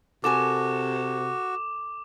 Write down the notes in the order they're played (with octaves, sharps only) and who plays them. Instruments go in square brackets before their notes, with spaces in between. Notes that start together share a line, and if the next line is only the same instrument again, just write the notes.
[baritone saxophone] C3 [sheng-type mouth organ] F#4 [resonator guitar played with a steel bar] A4 A#4 G#5 [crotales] D6 E7